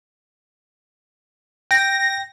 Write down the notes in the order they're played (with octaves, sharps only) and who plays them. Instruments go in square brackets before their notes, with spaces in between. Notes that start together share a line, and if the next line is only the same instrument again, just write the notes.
[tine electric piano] G5 [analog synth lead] A#6